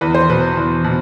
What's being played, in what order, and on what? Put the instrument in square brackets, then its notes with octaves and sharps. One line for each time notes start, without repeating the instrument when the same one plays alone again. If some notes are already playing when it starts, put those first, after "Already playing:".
[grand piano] E2 B4
C5
B2 B4
E2
B2